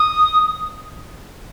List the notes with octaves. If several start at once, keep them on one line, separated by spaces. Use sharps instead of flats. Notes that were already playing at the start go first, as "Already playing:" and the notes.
Already playing: D#6